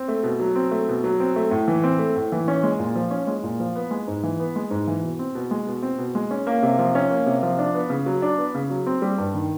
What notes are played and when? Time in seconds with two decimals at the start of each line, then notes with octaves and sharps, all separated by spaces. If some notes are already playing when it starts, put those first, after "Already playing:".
Already playing: C4
0.08 A3
0.23 B2
0.40 F#3
0.55 C4
0.71 A3
0.88 B2
1.04 F#3
1.20 C4
1.36 A3
1.51 A2
1.68 E3
1.84 C4
1.99 A3
2.16 A2
2.32 E3
2.48 C#4
2.63 G#3
2.79 A#2
2.96 F3
3.11 C#4
3.27 G#3
3.43 A#2
3.60 F3
3.75 B3
3.91 G#3
4.08 G#2
4.23 E3
4.40 B3
4.56 G#3
4.71 G#2
4.87 E3
5.03 B2
5.19 C4
5.35 B2
5.51 G#3
5.67 B2
5.83 C4
5.98 B2
6.15 G#3
6.31 C#4
6.47 A#3
6.63 C3
6.79 F3
6.95 C#4
7.10 A#3
7.26 C3
7.43 F3
7.59 D4
7.75 B3
7.90 C#3
8.06 F#3
8.22 D4
8.38 B3
8.55 C#3
8.70 F#3
8.87 C4
9.02 G3
9.18 G2
9.34 D#3